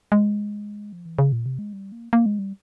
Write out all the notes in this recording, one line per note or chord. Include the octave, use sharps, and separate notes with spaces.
G#3
F3
E3
C#3
A#2
C3
G#3
G3
A#3
A#3
G#3
G3